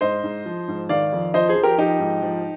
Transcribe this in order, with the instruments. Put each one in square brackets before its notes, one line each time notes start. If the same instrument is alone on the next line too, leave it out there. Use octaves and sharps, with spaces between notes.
[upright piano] G#2 C5 D#5
G#2
F3
G#2
D#3 D5 F5
F2
F3 C5 D#5
G#4 C5
F3
G4 A#4
F3 D#4 G4
G#2
F3